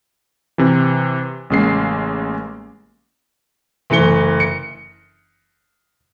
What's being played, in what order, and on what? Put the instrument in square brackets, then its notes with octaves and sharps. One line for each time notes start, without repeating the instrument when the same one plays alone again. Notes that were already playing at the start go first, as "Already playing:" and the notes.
[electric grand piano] C3 E3
A1 C#3 G#3 A#3 C7
[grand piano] F#1 E3 A3 C#7 G7
C#7